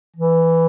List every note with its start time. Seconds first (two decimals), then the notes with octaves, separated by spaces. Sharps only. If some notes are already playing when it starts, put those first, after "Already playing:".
0.16 E3